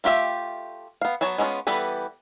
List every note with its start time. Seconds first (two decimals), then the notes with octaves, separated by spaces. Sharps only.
0.04 A3 F4 G4 E5 G5
1.01 B3 F5
1.21 F#3 B3 C#5 A5
1.38 G#3 B3 C#4 E4 F4
1.67 E3 G3 B3 A4 B4